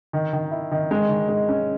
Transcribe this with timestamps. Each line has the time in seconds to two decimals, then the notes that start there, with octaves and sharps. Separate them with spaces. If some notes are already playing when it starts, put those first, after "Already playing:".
0.13 D#3
0.33 D#3
0.51 E4
0.71 D#3
0.91 G#3
1.09 D#3
1.28 G#3
1.49 C#4